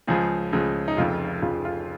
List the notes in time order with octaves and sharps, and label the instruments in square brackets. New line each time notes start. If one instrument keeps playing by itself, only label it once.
[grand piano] C#2 C#3 F3 G#4
C#2 C#3 F3
D#4
F1 F2 C#3 F4
F1 F2 C#3 F4
F4